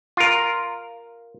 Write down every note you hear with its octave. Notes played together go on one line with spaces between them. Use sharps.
F4 A#4